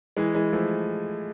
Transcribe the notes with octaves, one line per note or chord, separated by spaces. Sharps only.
E3 G#3
E3 G#3
F3 A3